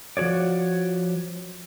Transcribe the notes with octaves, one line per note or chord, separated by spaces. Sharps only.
F3 F#4 G#4 C#5 D5